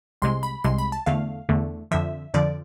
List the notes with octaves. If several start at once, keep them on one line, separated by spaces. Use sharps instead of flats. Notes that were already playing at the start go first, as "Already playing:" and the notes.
C2 C3 G#3 C6
B5
C2 C3 G#3 C6
B5
A5
E2 D3 A3 F5
E2 D3 A3
F2 D3 F3 E5
F2 D3 F3 D5